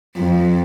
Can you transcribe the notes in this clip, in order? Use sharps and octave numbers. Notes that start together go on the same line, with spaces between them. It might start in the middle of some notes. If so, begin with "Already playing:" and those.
F2